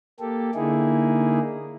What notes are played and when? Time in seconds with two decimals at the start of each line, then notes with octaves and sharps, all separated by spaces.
0.20 A#3 G4 A4
0.55 D3 A#3 D#4 E4 G#4